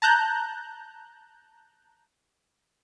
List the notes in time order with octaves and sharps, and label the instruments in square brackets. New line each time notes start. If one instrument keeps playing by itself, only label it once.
[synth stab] A5 A#5 F#6 G6